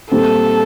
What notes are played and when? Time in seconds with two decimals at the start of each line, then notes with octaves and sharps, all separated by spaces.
0.11 A#2 G3 C4 A4